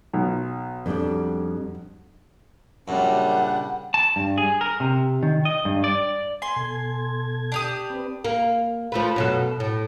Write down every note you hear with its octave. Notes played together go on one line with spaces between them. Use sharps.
B1
F2 G3 D4
F#2 A#2 C#3 G3 D4 F#5
A5
G2
G#4
A#4
C3
D#3
D#5
G2
D5
G#5 C6
B2 A4 G#6
D4 G4 D#6
C4 B4
A#3
F3 A3 B4
F#2 B2 A4
A2